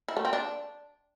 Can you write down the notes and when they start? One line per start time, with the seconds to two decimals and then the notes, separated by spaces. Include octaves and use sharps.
0.08 E4
0.17 A3
0.25 C4
0.33 D4